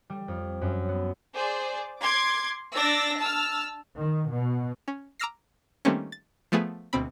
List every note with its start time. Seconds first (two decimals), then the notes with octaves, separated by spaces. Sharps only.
0.10 G3
0.28 F2
0.61 F#2
0.89 B3
1.35 G#4 C5 D5
2.00 C6 D6 G#6
2.75 D4 D5 E6 A6 A#6
3.19 A5 E6 F6
3.96 D#3
4.32 B2
4.88 C#4
5.20 A#5 D6 E6 F6 A#6 C7
5.85 D#3 G3 A3 A#3 C4 C#4
6.12 A6
6.52 F3 A3 B3 G#4
6.93 D2 B2 C4 B5